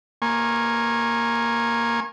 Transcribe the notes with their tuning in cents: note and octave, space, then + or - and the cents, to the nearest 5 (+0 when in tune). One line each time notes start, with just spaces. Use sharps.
A#3 +0 G#5 +0 C#6 -40